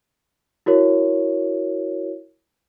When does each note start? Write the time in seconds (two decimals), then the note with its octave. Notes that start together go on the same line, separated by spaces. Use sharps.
0.66 E4 F#4 A#4 C#5